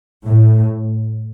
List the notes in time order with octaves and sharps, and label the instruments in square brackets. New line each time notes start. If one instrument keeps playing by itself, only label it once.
[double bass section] A2